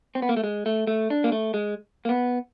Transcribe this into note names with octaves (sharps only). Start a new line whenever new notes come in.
C4
B3
A#3
A3
G#3
A3
A3
D4
A#3
A3
G#3
A#3
B3